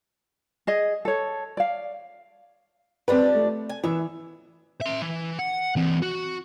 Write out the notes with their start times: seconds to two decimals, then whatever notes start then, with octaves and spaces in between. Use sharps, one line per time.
0.67 G#4 D#5
1.05 A4 C#5
1.57 D5 F5
3.08 F3 G3 C4 D4 B4
3.35 A3
3.69 G#5
3.84 E3 B3 E5
4.81 E5 C6
5.02 E3
5.39 F#5
5.76 E3 C4
6.03 F#4